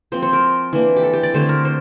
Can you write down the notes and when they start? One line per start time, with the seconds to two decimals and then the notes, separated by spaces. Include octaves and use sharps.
0.12 F3 C4 C5
0.22 C5
0.33 A#4
0.73 E3 A#3 D4
0.97 G4
1.03 A4
1.13 G4
1.23 D5
1.34 D3 A3 C4 C5
1.49 A#4
1.65 C5